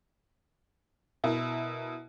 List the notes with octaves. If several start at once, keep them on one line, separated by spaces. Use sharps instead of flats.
B2 E4 A#4